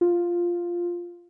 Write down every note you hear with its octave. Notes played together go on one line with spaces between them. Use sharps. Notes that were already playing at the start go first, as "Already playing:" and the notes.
F4